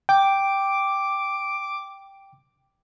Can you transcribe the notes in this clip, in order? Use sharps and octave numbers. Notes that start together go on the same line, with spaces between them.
G5 D6